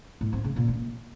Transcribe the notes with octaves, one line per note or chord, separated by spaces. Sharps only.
A2
C4
C#3
A#2
A#3